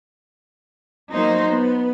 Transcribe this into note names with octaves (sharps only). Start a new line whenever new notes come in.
F#3 A#3 D#4 C5
B3